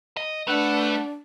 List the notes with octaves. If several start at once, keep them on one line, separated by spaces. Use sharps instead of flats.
D#5
A3 D4 B4 F#5